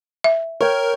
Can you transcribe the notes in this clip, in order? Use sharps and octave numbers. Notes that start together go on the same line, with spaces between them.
E5
A#4 C#5 G5